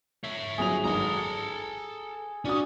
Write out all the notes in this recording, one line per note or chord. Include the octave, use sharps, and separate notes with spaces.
C#5 E5
G1 F#3 G#4 F7
G#1 A4 A#5
C#7
C#4 D4 F#4 D#6